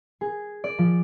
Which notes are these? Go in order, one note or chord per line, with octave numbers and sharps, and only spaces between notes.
G#4
D5
F3